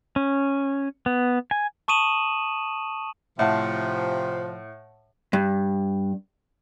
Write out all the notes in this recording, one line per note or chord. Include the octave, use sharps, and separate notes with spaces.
C#4
B3
G#5
A5 C#6 D#6 D#7 E7 F#7
A2 C3 F3 E5 F#5 A5
G2